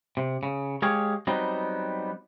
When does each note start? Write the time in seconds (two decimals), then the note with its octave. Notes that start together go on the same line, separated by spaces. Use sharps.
0.17 C3
0.43 C#3
0.82 G#3 G4 G#4 C#5 F5
1.27 F#3 G3 B3 C4 D#4